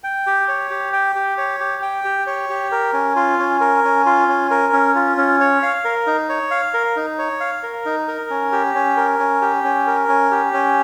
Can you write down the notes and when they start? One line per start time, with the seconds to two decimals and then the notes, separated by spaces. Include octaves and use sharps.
0.04 G5
0.26 G4
0.48 C#5
0.71 G4
0.93 G5
1.15 G4
1.38 C#5
1.60 G4
1.82 G5
2.04 G4
2.27 C#5
2.49 G4
2.72 A#4
2.93 C#4
3.16 F4
3.39 C#4
3.61 A#4
3.84 C#4
4.06 F4
4.28 C#4
4.51 A#4
4.73 C#4
4.95 F4
5.17 C#4
5.40 C#5
5.63 F5
5.85 A#4
6.07 D#4
6.29 C#5
6.51 F5
6.74 A#4
6.96 D#4
7.19 C#5
7.40 F5
7.63 A#4
7.85 D#4
8.08 A#4
8.30 C#4
8.52 G4
8.75 C#4
8.97 A#4
9.19 C#4
9.42 G4
9.64 C#4
9.87 A#4
10.09 C#4
10.31 G4
10.53 C#4